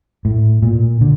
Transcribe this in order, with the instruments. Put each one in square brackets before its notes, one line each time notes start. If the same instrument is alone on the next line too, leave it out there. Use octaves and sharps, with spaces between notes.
[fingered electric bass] A2
A#2
D3